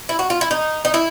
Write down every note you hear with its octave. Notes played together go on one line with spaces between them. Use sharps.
E4
F#4
F4
E4
D#4
D#4
E4